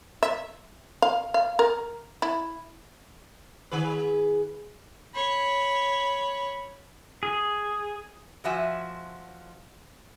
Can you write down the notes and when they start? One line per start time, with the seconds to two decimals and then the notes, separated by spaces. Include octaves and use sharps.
0.23 E5
1.02 F5
1.34 F5
1.59 A#4
2.22 E4
3.71 D#3 G#4 B4
5.14 C#5 B5
7.23 G#4
8.44 F2 F3 F#4 E5 G#5